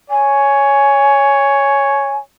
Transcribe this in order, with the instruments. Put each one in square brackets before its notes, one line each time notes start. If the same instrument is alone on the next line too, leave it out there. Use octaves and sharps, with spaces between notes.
[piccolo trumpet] C#5 [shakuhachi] G#5